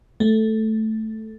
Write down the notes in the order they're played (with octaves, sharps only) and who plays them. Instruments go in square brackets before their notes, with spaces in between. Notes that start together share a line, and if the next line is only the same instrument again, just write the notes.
[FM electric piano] A3